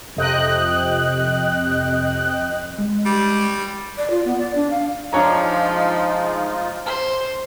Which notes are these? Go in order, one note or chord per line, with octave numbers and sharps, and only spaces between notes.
F2 C3 D#5 G5 F#6
G#3
G3
D5
F4
B3
D5
D4
F5
F3 G#3 D4 D#4 F4 C#5 A#5
C5